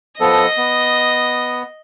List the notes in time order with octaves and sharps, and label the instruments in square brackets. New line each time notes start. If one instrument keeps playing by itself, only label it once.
[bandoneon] F3 B3 A4 [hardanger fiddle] D#5
[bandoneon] B3